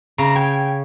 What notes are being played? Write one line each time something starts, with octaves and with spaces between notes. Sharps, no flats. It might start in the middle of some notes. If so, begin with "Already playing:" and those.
C#3 A#5 A#6
C#5 G5 G#6